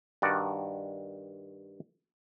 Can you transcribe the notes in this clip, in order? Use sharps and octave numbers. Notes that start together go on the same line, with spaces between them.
G2 D#3 F#4 D5